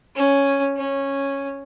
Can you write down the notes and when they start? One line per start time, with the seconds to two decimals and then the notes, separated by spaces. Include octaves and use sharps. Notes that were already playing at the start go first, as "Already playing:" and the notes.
0.15 C#4
0.77 C#4